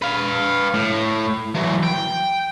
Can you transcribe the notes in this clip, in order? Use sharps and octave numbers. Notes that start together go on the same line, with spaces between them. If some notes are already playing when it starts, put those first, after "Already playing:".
B4 F5
A2
E3 F#3
G5